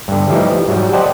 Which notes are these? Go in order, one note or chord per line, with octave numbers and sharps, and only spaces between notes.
G2 D3
E3 F3 G3 A3 D#4 E4
G#2 F#3 G3
C5 D5 D#5 F#5 G5 A5